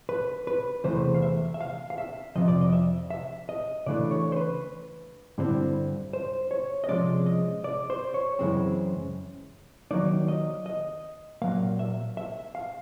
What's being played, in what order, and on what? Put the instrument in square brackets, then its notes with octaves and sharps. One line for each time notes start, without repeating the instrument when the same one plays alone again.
[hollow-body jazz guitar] B4
B4
E2 C3 E3 A3 C5
F5
E5
E5
F5
F5
E5
F2 C3 F3 D#5
D5
D#5
E5
E5
D#5
C#3 E3 A3 D4 D5
C#5
C5
B4
G2 D3 G3 C4 E4
C5
C#5
D#5
C3 F3 G#3 C#4 D5
D#5
D5
C5
C#5
F#2 C#3 E3 G#3 C4
D#3 F#3 A#3 D#4 D5
D#5
D#5
A#2 F#3 A#3 F5
E5
E5
F5